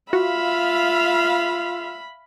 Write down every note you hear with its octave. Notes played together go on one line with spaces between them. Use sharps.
F4 F#4 E5 F5 B5